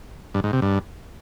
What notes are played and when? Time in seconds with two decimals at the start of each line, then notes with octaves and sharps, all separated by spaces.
0.35 G2
0.44 G#2
0.53 C3
0.62 G2